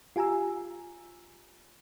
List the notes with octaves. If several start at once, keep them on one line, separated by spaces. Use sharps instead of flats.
F4 G4 G#5 A#5 E6